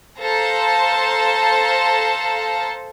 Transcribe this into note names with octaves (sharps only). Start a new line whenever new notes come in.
A4 C5 F5 A5 A#5